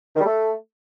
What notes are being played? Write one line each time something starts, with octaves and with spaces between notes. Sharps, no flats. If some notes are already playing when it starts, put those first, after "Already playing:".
D#3
G3
A3